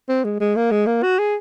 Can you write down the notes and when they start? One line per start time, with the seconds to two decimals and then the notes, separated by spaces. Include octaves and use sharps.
0.09 C4
0.24 G#3
0.40 G#3
0.56 A#3
0.71 G#3
0.87 A#3
1.03 F#4
1.19 G#4